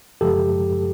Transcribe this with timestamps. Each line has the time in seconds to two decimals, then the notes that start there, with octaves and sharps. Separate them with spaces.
0.21 F#2 C#3 F3 G#3 G4 A4